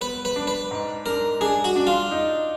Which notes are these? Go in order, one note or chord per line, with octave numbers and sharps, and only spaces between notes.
B3 B4
B4
D4
B4
G#2
D4 A#4
D4 G#4
F#4
D4
F4
D#4